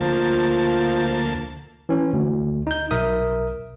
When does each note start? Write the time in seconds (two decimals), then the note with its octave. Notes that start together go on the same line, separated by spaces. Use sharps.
0.01 D2 F3 A#3 A5
1.89 E3 C#4
2.13 D2
2.67 D#4 G6
2.91 B1 A#4 E5 D#6